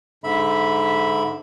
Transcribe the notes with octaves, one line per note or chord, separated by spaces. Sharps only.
G#2 D3 E5 B5